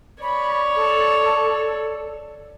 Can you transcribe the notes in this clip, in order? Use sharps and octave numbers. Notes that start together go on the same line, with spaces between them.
C#5 D5 B5
A4